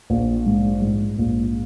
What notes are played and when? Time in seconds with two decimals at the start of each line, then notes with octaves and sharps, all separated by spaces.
0.10 A#1
0.46 G#2
0.82 G#2
1.19 A#1